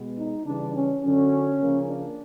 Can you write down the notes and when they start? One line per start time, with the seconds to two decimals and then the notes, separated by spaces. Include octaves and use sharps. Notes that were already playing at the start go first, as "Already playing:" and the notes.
Already playing: B2 G#3 B3
0.17 D#4
0.46 C#3 E3 G3 D4
0.74 C#4
1.03 F#2 D3 F#3 C#4
1.60 C#3 F3 A#3
1.89 D4